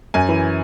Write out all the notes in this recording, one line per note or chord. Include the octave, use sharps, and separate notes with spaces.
F#2 G#5
E3